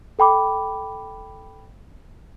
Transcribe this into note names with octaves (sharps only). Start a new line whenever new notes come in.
A4 G5 B5 D6